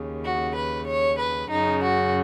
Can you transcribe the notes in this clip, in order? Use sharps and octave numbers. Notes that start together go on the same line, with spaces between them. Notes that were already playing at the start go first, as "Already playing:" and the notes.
Already playing: D#2 C#3
F#4
B4
C#5
B4
F#2 C#3 D#4
F#4